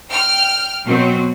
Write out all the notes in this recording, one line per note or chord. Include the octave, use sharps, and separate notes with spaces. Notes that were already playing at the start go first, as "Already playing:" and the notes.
G5 F6
B2 F#3 C4